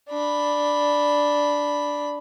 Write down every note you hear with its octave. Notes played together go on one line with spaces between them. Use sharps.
D4 B5